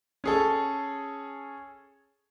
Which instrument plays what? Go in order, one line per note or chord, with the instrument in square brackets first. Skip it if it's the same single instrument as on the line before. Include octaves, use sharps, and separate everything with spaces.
[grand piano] C#4 G#4 A4